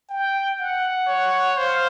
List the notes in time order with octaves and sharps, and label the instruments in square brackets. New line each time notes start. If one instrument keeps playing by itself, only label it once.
[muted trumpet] G5
F#5
[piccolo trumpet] C#5
[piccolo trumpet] C5 [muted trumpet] F5